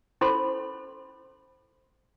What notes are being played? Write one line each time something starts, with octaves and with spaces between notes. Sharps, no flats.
C#4 E4 A4 C5 B5 C6